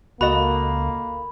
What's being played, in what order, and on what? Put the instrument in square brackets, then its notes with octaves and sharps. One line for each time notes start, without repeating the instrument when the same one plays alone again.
[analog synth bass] C#2 [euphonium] A#3 [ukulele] F#4 A4 D#5 [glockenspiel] B5